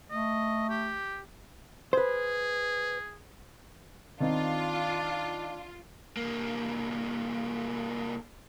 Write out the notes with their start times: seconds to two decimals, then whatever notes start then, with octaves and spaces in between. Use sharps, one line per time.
0.10 A3 D#5
0.70 G4
1.93 G#4 B4 C5
4.20 D#3 C4 D4 D#4 F4
6.17 C2 A#3